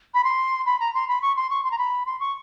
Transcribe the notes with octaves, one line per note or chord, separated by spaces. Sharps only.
B5
C6
B5
A#5
C6
B5
C#6
C6
C#6
C6
A#5
B5
C6
C#6